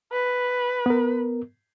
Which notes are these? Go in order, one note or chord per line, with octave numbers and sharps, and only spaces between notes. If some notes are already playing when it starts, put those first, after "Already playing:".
B4
B3 A#4